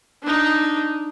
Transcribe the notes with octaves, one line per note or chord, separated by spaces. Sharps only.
D4 D#4